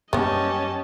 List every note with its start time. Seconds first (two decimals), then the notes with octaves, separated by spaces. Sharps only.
0.13 F#2 G3 A#3 B3 C#4 G4 D#5 A5